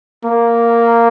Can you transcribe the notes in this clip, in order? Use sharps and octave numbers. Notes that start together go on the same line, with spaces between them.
A#3